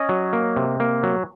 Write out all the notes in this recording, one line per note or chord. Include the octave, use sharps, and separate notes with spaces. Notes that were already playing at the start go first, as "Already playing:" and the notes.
Already playing: C#4 D#5
F#3
A#3
C3
A#3
F#3